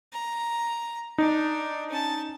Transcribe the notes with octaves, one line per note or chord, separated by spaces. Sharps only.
A#5
D4 D#4
C#4 A5